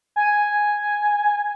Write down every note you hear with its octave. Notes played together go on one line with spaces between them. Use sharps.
G#5